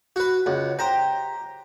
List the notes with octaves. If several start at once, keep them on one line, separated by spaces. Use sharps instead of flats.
F#4 B4
C#2 F#5
G4 C5 A#5